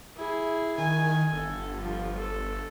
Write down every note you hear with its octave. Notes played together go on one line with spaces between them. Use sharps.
E4 G#4
D#3 G#5
G1 A4
F3
A4